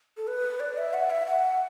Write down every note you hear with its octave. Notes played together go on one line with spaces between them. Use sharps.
A4
B4
D5
E5
F#5
E5
F#5